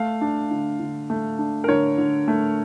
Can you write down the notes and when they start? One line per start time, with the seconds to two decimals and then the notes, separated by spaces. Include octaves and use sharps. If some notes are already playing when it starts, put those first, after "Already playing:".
Already playing: A3 F5
0.21 D4
0.51 D3
0.80 D3
1.10 A3
1.39 D4
1.64 A#4
1.68 D3 C#5
1.98 D3
2.28 A3